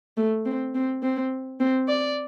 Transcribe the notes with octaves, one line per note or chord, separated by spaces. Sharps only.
A3
C4
C4
C4
C4
D5